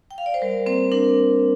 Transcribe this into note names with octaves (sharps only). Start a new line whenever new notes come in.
G5
F5
D5
C5
G3 A#4
A#3 C4 C5
D4 A#4